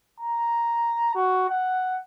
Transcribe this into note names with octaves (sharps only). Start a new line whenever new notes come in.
A#5
F#4
F#5